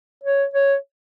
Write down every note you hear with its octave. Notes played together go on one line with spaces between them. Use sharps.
C#5
C#5